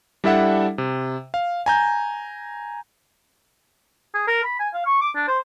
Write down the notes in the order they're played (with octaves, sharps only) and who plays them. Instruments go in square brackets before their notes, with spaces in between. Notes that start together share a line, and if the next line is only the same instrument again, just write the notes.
[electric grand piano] G3 D4 E4 A4 E5 F#5
C3
F5
G#5 A#5 G6
[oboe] G#4
A#4
B5
G#5
F5
C#6
D6
D4
C5